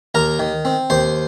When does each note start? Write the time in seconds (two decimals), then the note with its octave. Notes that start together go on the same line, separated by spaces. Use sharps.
0.15 D#2 A#4 A#5
0.39 D#3
0.65 C4
0.90 D#2 C5 C6